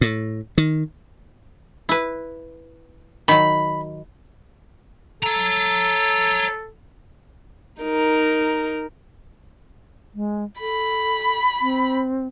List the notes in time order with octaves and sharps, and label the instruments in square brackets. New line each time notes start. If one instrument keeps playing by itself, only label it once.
[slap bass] A2
D#3
[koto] E4 B4
[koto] D#3 F#3 [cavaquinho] B5
[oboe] A4 [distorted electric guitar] C#5 A#5
[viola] D#4 A#4
[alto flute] G#3
[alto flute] A4 [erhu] B5
[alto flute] C4